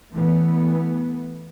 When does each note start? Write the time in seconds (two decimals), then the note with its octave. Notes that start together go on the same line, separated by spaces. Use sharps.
0.13 E3 A3 B3